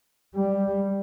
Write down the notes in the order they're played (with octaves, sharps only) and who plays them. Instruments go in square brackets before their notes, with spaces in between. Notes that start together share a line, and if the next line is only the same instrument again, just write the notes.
[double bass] G3